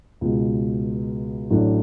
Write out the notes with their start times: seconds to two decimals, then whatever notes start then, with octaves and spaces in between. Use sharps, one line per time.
0.21 C#2 B2 G#3
1.50 A1 A2 F#3 A3 D4